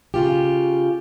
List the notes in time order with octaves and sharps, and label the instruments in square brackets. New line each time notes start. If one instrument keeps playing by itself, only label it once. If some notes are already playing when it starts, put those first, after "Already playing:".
[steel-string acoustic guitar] C#3 F4 G4